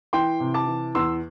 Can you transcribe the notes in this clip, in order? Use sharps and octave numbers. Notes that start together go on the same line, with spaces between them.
E3 G5 C6
C3
A5 D6
E3
E2 C6 E6